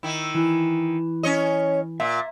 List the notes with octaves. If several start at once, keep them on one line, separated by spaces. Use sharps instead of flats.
D#3 E4
E3
C#4 C#5 D#5
A#2 E5